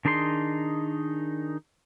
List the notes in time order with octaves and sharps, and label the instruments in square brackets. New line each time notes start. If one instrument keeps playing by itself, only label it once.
[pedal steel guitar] D#3 D4 D#4 G#4 C6